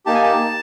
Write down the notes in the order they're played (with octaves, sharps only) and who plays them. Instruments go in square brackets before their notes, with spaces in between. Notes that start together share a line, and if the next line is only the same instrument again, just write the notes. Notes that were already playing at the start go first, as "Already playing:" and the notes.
[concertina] A#3 D#4 G4 A5
G#5
A5